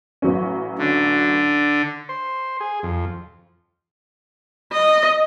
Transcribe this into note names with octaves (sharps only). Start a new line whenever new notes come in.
A1 F#3 C#4
D3
C5
G#4
F2
D#5